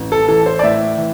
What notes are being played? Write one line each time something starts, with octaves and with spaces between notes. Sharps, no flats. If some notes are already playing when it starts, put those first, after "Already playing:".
Already playing: A1
A4
E3 A4
C5
D5
A2 E5
E3